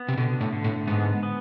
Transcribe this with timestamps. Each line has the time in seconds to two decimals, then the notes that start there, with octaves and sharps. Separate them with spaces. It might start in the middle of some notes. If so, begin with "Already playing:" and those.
Already playing: B3
0.08 C3
0.17 B2 D3
0.41 A2
0.53 D3
0.64 A2
0.87 G#2 B3
1.23 B3